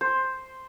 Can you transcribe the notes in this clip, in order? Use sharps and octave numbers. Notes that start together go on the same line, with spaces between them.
C5